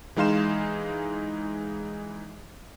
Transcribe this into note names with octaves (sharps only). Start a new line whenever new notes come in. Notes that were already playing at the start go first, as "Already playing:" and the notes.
E3 G#3 D#4 F5 C6 E7